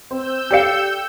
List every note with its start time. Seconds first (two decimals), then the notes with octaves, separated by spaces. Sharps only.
0.11 C4 E6 G6
0.51 G4 A4 D5 F5 C#7